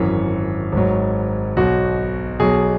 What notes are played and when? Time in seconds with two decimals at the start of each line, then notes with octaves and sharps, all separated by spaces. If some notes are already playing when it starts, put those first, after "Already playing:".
Already playing: G#1 F#2 E3 C#5
0.72 G#1 G#2 F#3
1.57 B1 B2 F#3 F#4
2.40 B1 B2 F#3 G#4